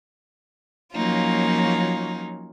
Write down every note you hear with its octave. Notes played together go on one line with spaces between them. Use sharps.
F3 F#3 A#3 C#4 D#4 F4